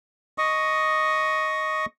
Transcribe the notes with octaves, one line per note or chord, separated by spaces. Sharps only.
D#5 C#6 D#6